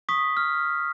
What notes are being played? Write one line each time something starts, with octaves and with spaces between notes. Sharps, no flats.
C#6 D#6 B6
F6